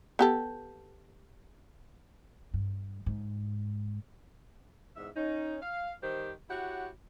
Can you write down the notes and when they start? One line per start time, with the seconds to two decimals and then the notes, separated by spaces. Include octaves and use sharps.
0.19 B3 G4 A4
2.54 G2
3.06 G#2
4.96 E2 G#2 E5
5.16 C#4 D#4
5.62 F5
6.03 D#3 G3 G4 C5
6.50 E4 F#4 G4 C#5 F#5